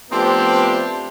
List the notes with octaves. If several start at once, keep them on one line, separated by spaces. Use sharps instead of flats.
F3 A3 B3 C4 D4 G4